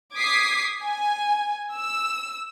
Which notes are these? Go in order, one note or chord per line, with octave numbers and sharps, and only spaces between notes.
D6 D#6 G#6 B6 C7
G#5
E6